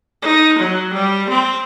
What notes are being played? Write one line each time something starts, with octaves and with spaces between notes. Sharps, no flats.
D#4
F#3
G3
C4